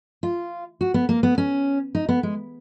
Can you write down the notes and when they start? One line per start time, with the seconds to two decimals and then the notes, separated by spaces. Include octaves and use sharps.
0.23 F4
0.81 F#4
0.94 B3
1.09 A#3
1.23 B3
1.38 C#4
1.95 D#4
2.09 B3
2.23 G#3